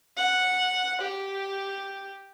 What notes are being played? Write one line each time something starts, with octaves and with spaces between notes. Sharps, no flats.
F#5
G4